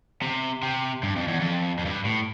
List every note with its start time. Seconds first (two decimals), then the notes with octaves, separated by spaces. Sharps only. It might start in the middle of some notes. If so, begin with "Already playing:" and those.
0.22 C3
0.63 C3
1.03 G2
1.16 F2
1.27 E2
1.40 F2
1.79 F2
1.85 G2
2.05 A2